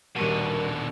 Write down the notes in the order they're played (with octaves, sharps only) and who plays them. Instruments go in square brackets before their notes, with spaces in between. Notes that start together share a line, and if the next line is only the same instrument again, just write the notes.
[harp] D#1 C#6 D#7 [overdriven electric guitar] B2 D3 [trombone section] G3 A#4